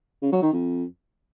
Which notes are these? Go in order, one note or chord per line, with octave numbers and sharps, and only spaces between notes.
C#3
F#3
D#3
F2